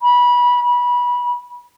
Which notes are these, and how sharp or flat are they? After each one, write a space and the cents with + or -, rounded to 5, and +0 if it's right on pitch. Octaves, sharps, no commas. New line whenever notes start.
B5 -20
B5 -20